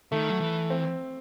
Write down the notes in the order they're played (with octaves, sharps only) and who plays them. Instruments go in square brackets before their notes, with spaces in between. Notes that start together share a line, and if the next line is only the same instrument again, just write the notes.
[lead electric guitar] D#3 [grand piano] A3
[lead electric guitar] F#3
E3
[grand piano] C4